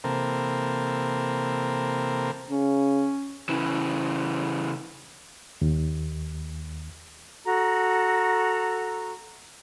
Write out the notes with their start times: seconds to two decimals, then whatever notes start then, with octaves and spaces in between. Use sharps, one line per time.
0.04 C3 E3 A#3 C4 A4 A#4
2.51 C#3 C#4
3.49 C#3 E3
5.62 D#2
7.45 F#4 A4 A#5